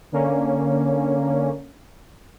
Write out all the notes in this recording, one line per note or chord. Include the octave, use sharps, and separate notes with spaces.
D3 A#3 C#4